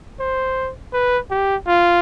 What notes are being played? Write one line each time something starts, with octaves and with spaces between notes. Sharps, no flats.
C5
B4
G4
F4